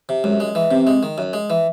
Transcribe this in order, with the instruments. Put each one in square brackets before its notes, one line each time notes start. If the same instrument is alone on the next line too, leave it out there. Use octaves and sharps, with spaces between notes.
[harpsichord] C3
[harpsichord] F#2 [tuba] G#3
[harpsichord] G#3
E3
[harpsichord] C3 [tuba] C4
[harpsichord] G#3
D#3
F#2
G#3
E3